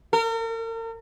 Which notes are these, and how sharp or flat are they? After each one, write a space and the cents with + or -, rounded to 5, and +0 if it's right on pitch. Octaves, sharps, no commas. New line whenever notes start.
A#4 -40